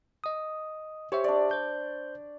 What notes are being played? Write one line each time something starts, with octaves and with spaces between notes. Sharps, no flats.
D#5 D#6
G4 C5 C#5 E5
D4 D5
C5 G6